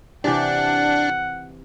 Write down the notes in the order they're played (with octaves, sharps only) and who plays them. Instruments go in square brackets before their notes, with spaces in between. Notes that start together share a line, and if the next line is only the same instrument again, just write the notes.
[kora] C3 E3 G4 [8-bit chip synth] D4 [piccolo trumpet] F#5